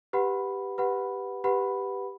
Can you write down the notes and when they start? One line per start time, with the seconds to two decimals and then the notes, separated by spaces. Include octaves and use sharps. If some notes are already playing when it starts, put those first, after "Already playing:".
0.13 G4 B4 F#5 B5
0.78 G4 B4 F#5 B5
1.44 G4 B4 F#5 B5